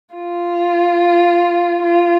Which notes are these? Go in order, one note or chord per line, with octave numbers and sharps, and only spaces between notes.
F4
F4